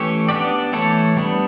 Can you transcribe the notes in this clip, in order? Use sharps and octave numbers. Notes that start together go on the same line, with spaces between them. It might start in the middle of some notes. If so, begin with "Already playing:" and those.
Already playing: E3 A3 C#4 G4 C#5
B3 D4 G4 D5
E3 A3 E4 A4 C#5
G3 B3 D4